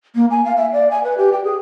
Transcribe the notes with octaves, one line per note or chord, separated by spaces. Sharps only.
A#3
G#5
F5
E5
D5
G#5
B4
G4
G5
G#4